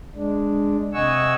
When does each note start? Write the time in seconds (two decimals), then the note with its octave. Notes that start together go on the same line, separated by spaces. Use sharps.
0.15 G#3 D4
0.93 C3 D#5 F#5 G#5 C#6 E6